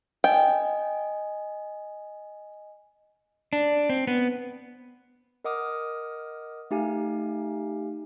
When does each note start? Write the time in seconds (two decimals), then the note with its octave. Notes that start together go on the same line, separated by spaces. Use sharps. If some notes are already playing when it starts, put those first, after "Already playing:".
0.24 D#5 G5 G#5
3.53 D4
3.90 C4
4.07 B3
5.45 A#4 D#5 F#5 D6 D#6 F6
6.71 A3 D#4 G4 F5 G#5